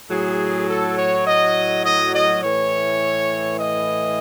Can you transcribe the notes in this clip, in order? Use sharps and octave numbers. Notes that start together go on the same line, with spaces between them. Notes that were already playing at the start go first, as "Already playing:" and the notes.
A2 F#3 G#4
A4
C#5
D#5
D#5
D#5
A2 E3 C#5
D#5